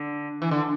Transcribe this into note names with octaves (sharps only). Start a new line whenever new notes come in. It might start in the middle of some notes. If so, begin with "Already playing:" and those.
Already playing: D3
E3
D3